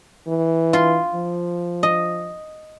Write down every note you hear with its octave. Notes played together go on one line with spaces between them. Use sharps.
E3
F4 C6
F3
D#5